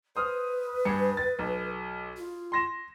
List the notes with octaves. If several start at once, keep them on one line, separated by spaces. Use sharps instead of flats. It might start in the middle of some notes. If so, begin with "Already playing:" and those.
B4 C5 D#6 F6
G2 G#4 C#7
A6
B1
F4
C6 A#6 E7